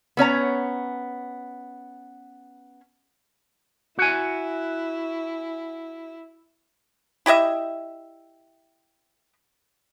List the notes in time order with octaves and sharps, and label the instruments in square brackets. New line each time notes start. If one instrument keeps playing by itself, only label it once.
[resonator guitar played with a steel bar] B3 C#4 C#5 A#5
[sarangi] E4 [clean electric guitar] F#4 G#5
[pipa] E4 G4 D#5 E5